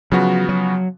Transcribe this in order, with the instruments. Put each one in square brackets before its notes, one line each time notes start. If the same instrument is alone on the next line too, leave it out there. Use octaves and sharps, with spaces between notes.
[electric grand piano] C#3 F3 B3 F#4 [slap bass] F#3
[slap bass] F#3